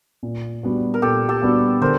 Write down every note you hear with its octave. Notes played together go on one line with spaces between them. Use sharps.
A#2
G3 B3 D4 F#4
A#4
A#2 G4 A4
G4 A4
G3 B3 D4 F#4
D3 A#4 C5